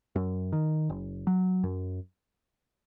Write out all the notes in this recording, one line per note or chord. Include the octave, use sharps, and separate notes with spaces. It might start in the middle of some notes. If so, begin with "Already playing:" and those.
F#2
D#3
F#1
F#3
F#2